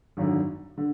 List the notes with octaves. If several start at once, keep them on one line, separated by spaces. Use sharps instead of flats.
G#1 F#2 D3
D3